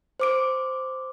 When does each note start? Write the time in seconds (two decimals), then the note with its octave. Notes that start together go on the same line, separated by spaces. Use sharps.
0.20 C5 D6 D7